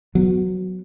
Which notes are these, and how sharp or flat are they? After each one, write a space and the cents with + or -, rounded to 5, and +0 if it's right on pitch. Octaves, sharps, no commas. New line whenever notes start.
F#3 +0 B3 +15